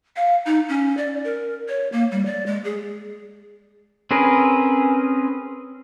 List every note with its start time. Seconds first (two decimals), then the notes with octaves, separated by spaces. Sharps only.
0.16 F5
0.46 D#4
0.69 C#4
0.97 D5
1.24 A#4
1.68 C#5
1.92 A#3
2.12 G3
2.26 D5
2.46 G#3
2.64 G#4
4.11 C4 C#4 G#4 A#4 B4